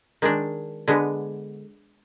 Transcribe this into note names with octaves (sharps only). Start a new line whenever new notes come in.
D#3 G#3 D4
D3 G#3 B3